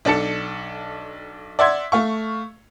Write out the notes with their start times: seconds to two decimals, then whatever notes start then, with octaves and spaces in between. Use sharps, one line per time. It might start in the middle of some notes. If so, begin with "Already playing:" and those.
0.05 B1 D4 A4 A5 C#7
1.59 D5 E5 F#5 C6 G#6
1.92 A3 F5 C#6